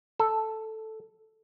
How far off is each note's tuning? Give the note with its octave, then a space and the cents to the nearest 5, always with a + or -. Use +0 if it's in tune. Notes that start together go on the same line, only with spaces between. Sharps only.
A4 +0